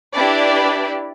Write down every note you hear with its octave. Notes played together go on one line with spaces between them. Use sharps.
D4 E4 G4 B4 D5